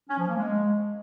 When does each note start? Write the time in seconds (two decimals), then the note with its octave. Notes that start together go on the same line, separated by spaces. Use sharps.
0.09 C#4
0.19 F3
0.28 A#3
0.37 G#3